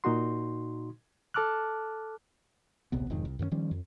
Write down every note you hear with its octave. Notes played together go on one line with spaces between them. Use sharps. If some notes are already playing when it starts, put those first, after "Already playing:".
A#2 D#4 F#4 C6
A4 A5 D6 F6 F#6
D1 A#1 C3 B3
E1 F2 G#2 D#3
C2
F#2 D#3 A#3 C#4
D#3 F3 G3 C#4
F2